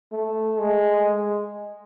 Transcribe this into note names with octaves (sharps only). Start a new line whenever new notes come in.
A3
G#3